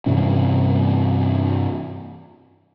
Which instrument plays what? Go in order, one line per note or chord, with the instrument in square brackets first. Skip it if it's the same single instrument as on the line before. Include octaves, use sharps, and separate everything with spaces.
[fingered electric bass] G2 C3 E3 C#4